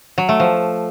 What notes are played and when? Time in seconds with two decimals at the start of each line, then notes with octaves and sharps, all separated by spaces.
0.18 F#3
0.29 A3
0.40 F3